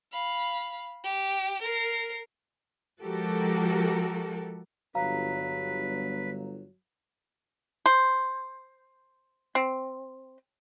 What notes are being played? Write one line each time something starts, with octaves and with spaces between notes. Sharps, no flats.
F5 B5
G4
A#4 C7
F3 G#3 F#4 G4 A4 A#4
G1 F#3 B4 F5 A#5
C5
C4